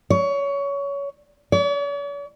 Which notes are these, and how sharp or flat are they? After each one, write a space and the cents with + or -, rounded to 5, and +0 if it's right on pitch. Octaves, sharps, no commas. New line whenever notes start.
C#5 +20
C#5 +45